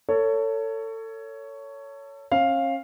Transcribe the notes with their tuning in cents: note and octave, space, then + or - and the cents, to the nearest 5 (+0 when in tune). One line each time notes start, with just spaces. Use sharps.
A4 +30 C#5 +10
C#4 -40 F5 +0